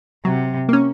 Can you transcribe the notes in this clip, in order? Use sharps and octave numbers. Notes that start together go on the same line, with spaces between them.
C3 F#3
A#3 C#4